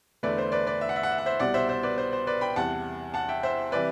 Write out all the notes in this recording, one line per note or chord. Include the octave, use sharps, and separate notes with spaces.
E2 D3 A3 B4 D5
C5
B4 D5
B4 D5
E5
F#5
E5
F#5
E5
F#5
C5 E5
C2 B2 G3 D5 F#5
C5 E5
C5 E5
B4 D5
C5
C5
B4 D5
G5 B5
E2 C3 G3 F#5 A5
F#5 A5
E5 G5
C5 E5
C3 E3 G3 B4 D5